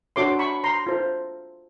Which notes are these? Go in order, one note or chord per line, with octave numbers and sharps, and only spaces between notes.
D4 F#4 A4 C#5 C6 D6
B5 C#6
A#5 C6
F4 A4 C5